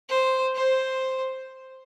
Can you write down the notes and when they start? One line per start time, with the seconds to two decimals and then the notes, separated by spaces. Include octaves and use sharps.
0.09 C5
0.55 C5